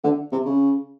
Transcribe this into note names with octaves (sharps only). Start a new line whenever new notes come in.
D3
C3
C#3